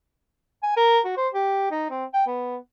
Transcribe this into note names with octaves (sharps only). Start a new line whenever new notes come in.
G#5
A#4
F#4
C5
G4
D#4
C4
G5
B3